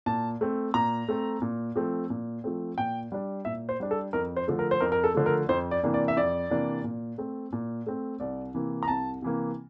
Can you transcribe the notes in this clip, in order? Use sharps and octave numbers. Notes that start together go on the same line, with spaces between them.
A#2 A5
A3 C4
A#2 A#5
A3 C4
A#2
F3 A3 C4
A#2
F3 A3 C4
A#2 G5
G3 D4
A#2 E5
C5
G3 D4
A4
F2 A#4
C5
D3 F3 A3
A#4
C5
F2 A#4
A#4
A4
D3 F3 A3
A#4
F2 C5
D5
C3 E3 A#3 D4
D5
E5
F2 D5
C3 E3 A#3 D4
A#2
A3 C4
A#2
A3 C4
C2 D5
C3 E3 A#3
A#5
C2 A5
C3 E3 A#3